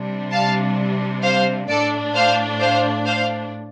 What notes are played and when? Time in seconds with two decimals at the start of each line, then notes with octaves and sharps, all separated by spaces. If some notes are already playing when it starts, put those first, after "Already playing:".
Already playing: C3 G3 D4
0.32 F5 A5
1.23 C5 F5
1.69 A2 A3 D4 A4 D5
2.15 C5 F5
2.60 C5 F5
3.06 C5 F5